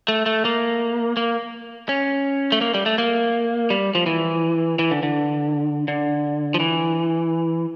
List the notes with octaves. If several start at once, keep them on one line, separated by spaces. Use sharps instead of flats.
A3
A3
A#3
A#3
C#4
A3
A#3
G3
A3
A#3
G3
F3
E3
E3
D3
D3
D3
F3
E3